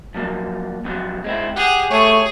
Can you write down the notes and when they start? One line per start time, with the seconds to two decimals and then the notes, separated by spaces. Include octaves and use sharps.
0.15 F3 F#3 A#3
0.85 F2 B2 F#3
1.24 G#3 C4 E4
1.56 G4 G#4 F#5
1.91 A3 G#4 C#5